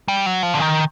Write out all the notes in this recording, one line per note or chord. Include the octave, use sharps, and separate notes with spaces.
G3
F#3
F3
D3
D#3